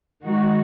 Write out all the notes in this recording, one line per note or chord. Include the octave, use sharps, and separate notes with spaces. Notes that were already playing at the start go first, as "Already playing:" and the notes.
D#3 G#3 D#4 F#4